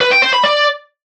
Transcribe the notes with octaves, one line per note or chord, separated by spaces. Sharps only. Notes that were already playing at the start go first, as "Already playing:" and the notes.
B4
G5
C5
B5
D5